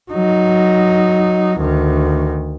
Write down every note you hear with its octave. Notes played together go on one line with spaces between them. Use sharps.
F#3 D#4
D2 D#3